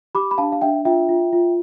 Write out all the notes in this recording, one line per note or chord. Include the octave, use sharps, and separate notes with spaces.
G4 B5 D6
B5
D4 F5 A5
F5
D4 E5 G5
F4 E5 G5
F4
F4